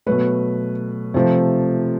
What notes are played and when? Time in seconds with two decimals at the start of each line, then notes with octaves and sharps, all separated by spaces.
0.06 B2 F#3 A3 B4
1.14 C3 F3 A3